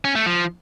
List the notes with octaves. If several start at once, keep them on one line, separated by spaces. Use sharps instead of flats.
C#4
A3
F3